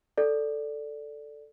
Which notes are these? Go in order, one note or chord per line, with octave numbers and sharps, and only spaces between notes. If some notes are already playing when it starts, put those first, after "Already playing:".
A4 D5